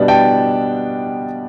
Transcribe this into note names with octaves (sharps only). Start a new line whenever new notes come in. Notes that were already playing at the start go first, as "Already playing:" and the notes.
Already playing: B2 G3 B3 D4
G5 A5